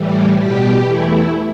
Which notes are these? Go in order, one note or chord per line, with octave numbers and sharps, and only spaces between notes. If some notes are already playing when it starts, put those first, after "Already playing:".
Already playing: A2 E3 G3
B2 G3 G4
E2 E3 A3 E4